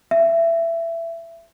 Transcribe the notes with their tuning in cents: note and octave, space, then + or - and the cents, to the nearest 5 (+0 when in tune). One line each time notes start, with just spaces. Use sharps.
E5 +20